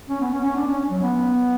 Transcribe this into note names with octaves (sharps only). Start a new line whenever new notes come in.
C#4
B3
C#4
C#4
D4
C#4
F#3
B3